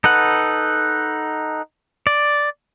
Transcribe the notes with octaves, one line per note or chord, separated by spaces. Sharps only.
D#4 A4 B4 F#5
D5